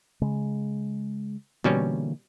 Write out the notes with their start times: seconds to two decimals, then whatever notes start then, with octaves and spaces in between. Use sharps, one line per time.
0.22 C#3 G#3
1.64 B2 D3 E3 G3 A#3 C#4